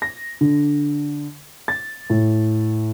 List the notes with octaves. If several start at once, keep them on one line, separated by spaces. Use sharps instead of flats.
A#6
D3
A6
A2